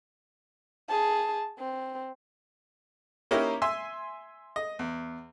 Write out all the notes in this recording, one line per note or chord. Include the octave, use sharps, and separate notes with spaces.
G#4 A5
C4
A#3 C#4 D#4 E4 G4 A#4
E5 G#5 C6 E6
D#5
E2